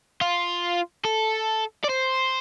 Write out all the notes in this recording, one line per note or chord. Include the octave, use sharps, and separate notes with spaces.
F4
A4
D5
C5